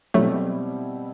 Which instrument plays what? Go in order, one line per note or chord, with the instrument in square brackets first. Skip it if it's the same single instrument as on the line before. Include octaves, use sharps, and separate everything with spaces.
[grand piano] B2 G3 C4 E4 G4 [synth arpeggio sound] F#3 A3